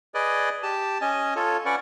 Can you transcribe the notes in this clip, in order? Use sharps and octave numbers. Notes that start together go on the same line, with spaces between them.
G#4 B4 D5 D#5
G4 A5
C#4 D#5 G#5
F4 A4 C#5
C#4 B4 D5 F#5 C#6